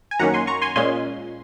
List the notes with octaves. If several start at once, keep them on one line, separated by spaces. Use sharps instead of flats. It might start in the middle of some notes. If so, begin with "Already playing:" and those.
G#5
F#2 D#3 A#3 C#4 F#5 A#5
G#5 C6
A#5 C#6
G#5 C6
A#2 G#3 C#4 G#5 C6